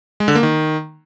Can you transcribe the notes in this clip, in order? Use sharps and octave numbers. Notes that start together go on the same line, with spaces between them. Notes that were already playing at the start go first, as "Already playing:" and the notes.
G#3
D3
A#3
D#3